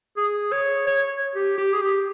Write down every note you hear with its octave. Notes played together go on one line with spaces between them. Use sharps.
G#4
C#5
C#5
G4
G4
G#4
G4